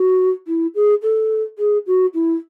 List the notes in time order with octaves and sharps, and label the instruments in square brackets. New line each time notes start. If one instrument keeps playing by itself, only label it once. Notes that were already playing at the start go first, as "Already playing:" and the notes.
Already playing: [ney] F#4
E4
G#4
A4
G#4
F#4
E4